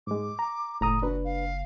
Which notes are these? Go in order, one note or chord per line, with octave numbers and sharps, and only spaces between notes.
G#2 G#3 D6
A#5
F#1 A2 A#5 D#6
D4 F#4 B4
F5